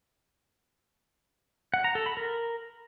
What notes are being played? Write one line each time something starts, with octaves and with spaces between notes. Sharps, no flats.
F#5
A#5
A4
B5
A#4